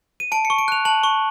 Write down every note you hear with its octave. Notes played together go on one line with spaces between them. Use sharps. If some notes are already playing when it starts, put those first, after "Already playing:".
D#7
A5 D7
C#7
C#6
D7
F#6 F7
A5 F#7
C#6